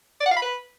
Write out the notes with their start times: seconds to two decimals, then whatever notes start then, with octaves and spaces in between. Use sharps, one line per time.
0.20 D5
0.26 F#5
0.31 F5
0.37 B5
0.42 B4